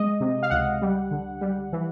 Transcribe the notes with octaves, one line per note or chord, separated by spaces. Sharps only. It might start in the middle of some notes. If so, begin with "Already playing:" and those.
Already playing: G#3 D#5
C3
F5
C#2 F#5
G3
D3
G3
E3